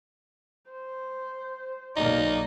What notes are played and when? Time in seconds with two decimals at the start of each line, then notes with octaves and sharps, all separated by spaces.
0.71 C5
1.96 B1 B2 A#3 D#4 D5